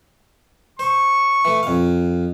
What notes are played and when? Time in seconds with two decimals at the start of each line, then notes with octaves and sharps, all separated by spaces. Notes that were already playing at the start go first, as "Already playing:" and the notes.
0.79 C5 C#6
1.45 E3 A3
1.63 F2 F5